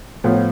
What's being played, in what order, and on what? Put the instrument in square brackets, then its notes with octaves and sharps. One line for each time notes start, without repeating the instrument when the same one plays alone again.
[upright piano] A2 F3 B3 F4